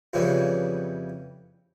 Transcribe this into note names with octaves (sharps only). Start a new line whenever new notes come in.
F2 C#3 E3 G3